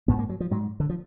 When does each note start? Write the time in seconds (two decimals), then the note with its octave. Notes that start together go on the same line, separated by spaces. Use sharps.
0.08 G#2 B3
0.19 A#3
0.29 F#3
0.40 F3
0.51 G#2 F#3
0.80 D3
0.89 F3